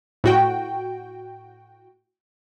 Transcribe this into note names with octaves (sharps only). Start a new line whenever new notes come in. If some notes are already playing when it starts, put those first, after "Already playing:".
A2 F#4 G5